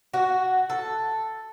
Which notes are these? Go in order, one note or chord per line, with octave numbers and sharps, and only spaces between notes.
F#4
A4